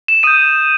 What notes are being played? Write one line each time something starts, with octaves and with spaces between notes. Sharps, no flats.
E7
D#6 G6 D#7